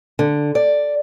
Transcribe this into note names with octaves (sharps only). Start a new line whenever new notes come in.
D3
D5